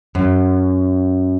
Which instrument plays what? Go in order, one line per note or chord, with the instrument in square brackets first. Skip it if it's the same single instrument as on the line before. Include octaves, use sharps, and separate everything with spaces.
[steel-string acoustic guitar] F#2